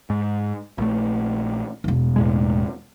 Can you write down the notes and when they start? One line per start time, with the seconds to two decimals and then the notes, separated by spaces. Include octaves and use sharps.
0.10 G#2
0.78 A#1 A3
1.84 E1 A3
2.16 E2 A2 G#3